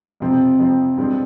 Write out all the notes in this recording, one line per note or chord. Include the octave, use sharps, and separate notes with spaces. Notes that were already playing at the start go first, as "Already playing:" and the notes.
F2 C3 F3 C4
F2 C3 F3 C4
G2 F3 G#3 C4